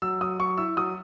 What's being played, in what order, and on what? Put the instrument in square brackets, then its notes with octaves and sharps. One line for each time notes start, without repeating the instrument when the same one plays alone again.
[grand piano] F#3 E6
F#3 D#6
F#3 C#6
E4 E6
F#3 D#6